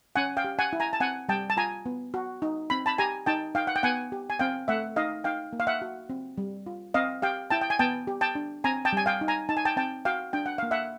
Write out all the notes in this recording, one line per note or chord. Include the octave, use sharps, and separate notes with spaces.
C#4 F#5 G#5
F5 G5
G4
F#5 G#5
E4
G#5 A#5
A5
C4 F#5 G#5
G3 G5 A5
A5
F4 G#5 A#5
B3
F#4
D#4
C4 B5
A5 B5
G4 G#5 A#5
D#4 G5 A5
D#4 F5 G5
F#5
G5
B3 F#5 G#5
G4
G#5
C4 F5 G5
A3 E5 F#5
D#4 D#5 F5
D#4 F5 G5
A#3
F5
E5 F#5
F#4
C4
G3
F4
C4 D#5 F5
G4 F5 G5
E4 G5 A5
G5
G#5
B3 G5 A5
G4
G5 A5
D4
C4 G#5 A#5
G5 A5
G3 G#5
F5 G5
D#4
G#5 A#5
D#4 A5
G#5
G5 A5
C4 G5 A5
F#4 F5 G5
D4 G5
F#5
A#3 F5
E5 F#5